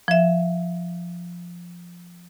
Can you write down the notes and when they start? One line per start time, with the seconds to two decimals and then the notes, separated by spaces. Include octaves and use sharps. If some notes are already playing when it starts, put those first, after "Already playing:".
0.08 F3 E5